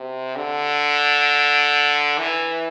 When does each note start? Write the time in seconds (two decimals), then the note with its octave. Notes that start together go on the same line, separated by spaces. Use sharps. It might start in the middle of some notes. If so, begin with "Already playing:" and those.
Already playing: C3
0.36 D3
2.19 E3